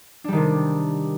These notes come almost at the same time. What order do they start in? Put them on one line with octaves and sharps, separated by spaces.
D4 G3 D#3 C3